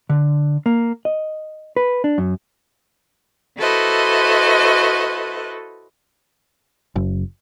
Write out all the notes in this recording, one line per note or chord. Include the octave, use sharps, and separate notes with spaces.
D3
A#3
D#5
B4
D4
F#2
E4 F#4 A4 B4 C5 D#5
F#1